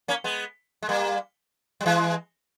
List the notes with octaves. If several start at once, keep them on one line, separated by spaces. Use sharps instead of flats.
A#3 C#4
G#3 B3
G#3
G3 A#3
G3
E3 G#3